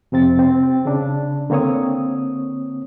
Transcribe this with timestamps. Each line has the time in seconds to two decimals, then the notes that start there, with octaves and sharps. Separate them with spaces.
0.12 F2 C3 C4 A6
0.39 C4
0.85 C#3 D4
1.50 D3 A#3 C4 C#5 D#6